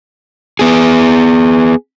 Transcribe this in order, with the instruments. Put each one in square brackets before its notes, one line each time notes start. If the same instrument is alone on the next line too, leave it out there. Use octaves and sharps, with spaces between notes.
[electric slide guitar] B3 G#4